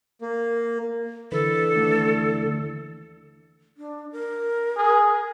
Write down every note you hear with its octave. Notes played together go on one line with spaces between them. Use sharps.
A#3
D3 E3 A4 B4
D#2 A3 D4
D4
A#4
G#4